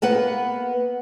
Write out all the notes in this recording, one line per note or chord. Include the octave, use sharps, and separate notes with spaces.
A#3 B3 B4 F#5